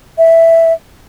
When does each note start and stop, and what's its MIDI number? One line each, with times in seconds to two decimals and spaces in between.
0.18 0.73 76